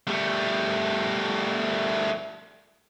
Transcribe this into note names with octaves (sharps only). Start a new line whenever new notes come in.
G3 A3